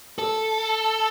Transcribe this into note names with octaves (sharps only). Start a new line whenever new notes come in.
A4